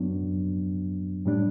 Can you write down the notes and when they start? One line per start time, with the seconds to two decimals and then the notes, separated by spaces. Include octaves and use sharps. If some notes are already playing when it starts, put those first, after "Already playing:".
Already playing: F#2 F#3 B3 D4
1.25 A2 G3 D4